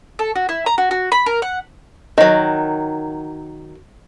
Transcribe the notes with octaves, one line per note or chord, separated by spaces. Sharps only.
A4
F#4
E4
A#5
F#4
F#4
B5
A#4
F#5
D#3 F#3 D#5